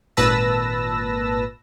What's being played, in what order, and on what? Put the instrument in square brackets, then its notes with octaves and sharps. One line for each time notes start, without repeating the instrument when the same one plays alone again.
[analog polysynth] G#1 A#2 B4 A5 E6 A#6